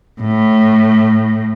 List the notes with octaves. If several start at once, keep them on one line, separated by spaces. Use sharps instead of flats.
A2